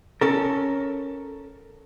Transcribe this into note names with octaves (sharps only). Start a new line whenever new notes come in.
C#4 A4 A#4